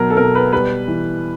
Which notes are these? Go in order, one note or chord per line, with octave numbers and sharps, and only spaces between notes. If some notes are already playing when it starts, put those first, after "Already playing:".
Already playing: B2 F#3 A#4
A4
B2 A#4
B4
G3 B4
E3